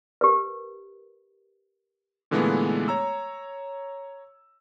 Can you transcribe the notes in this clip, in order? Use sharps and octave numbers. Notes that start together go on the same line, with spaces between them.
G4 A#4 B4
A#2 D3 E3 G#3 A3 B3
C#5 A#5 E6